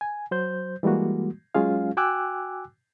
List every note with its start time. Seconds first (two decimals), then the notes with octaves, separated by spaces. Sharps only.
0.01 G#5
0.31 F#3 C5 G6
0.83 E3 G3 G#3 A#3 F#4
1.55 F#3 G#3 C#4 F4 G#4 F5
1.97 F#4 G5 G#5 D6 E6 F#6